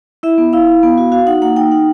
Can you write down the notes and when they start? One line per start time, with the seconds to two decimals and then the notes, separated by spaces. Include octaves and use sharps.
0.23 E4 E5
0.38 B3
0.53 E4 F5
0.67 E4
0.83 B3
0.98 F#4
1.12 F#4 F5
1.27 D#4 F#5
1.42 A#3 F#5
1.56 D#4 G5
1.71 D#4